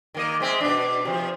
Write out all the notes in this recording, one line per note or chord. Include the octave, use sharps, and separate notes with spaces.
D#3 A#3 D#5
G#3 C4 E5
B2 D4
C3 F3